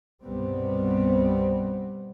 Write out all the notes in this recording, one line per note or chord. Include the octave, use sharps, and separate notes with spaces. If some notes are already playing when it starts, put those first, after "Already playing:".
C2 G2 B2 G3 B3 C4